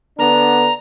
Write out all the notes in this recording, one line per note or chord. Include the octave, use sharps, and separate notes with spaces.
D3 B3 D4 A#5